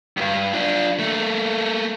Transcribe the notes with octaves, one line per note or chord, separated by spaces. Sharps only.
C#2 G2
D4 F4
A3 A#3